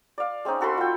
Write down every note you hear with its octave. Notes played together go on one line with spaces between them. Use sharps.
D5 F5
G#3 C4 C#4 D#4
F#4 A4 B5 C6
F4 G5